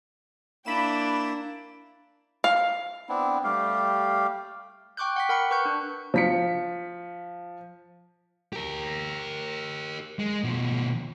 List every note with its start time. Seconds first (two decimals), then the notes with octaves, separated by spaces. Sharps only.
0.66 A#3 D4 E4 G5 B5 E7
2.44 F5
3.09 B3 C4 D4 E4
3.44 G3 A3 G4 F5
4.97 G5 C#6 D6 F#6 G6
5.16 F#5 G5 B6
5.29 A#4 F#5 B5 C#7
5.51 B4 C#6 F#6 G6
5.65 D4
6.14 F3 B6 C#7
8.53 G4 A#4
10.19 G#3
10.44 B2 F3